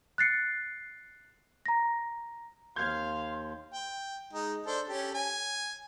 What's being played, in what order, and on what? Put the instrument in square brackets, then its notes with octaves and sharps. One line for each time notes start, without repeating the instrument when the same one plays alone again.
[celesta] F#6 A6 C7 C#7
A#5 A#6
[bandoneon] D#2 [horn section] F5 [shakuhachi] C6 [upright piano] G6 G#6
[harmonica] G5
G#3 D#4
D4 A4 C5
C#4 G4 A4
G#5